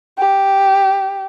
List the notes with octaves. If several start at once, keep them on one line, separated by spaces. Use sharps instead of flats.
G4